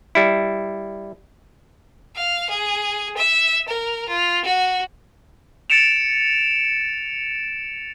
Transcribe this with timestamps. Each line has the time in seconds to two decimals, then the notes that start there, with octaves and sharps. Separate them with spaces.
0.15 G3 E4
2.16 F5
2.50 G#4
3.17 E5
3.68 A#4
4.08 F4
4.44 F#4
5.70 A6 C#7 D7 E7 F7